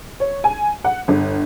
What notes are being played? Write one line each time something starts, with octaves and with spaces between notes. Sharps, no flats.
C#5
G#5
F#5
G1